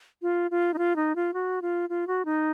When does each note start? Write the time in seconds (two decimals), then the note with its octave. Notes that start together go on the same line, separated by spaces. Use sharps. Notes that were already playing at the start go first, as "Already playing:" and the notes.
0.22 F4
0.51 F4
0.74 D#4
0.78 F4
0.96 D#4
1.16 F4
1.34 F#4
1.62 F4
1.89 F4
2.07 F#4
2.25 D#4